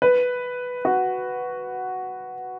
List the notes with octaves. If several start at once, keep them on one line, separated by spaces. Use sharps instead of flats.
B4
F#4